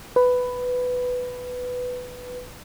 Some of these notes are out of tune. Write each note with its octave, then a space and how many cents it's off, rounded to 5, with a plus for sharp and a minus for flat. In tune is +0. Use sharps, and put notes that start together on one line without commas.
B4 +10